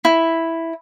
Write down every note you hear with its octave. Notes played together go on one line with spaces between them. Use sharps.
E4